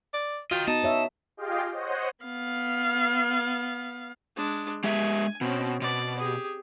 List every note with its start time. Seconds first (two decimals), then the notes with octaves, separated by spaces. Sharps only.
0.14 D5
0.51 F4 F#4 D#5 G5
0.68 B3 D#4 F#4 A5
0.83 F#4 C#5 E5
1.37 F4 G4 G#4 D#5 F5 G5
1.72 C5 C#5 D#5 F#5
2.24 B3 F5
4.36 G#3 D4
4.84 G#3 G4 E5 G#5
5.41 B2 C4 C#4
5.82 B2 D5
6.19 G4 G#4